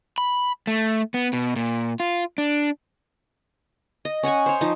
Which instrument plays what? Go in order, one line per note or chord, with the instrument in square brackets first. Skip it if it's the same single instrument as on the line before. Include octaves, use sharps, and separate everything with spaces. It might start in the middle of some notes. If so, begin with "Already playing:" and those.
[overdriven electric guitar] B5
A3
B3
B2
A#2
F4
D4
[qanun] D#5
C#4 F#5 G#5 C#6
C5 C#5
F3 D#4